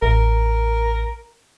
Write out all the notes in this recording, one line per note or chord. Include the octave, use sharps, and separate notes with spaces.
A1 A#4